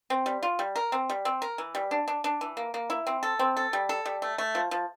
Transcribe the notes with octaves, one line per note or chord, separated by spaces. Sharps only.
C4
G3
F4
G3
A#4
C4
G3
C4
A#4
E3
G3
D4
D4
D4
E3
A#3
A#3
E4
C4
A4
C4
A4
G3
A4
G3
A3
A3
F3
F3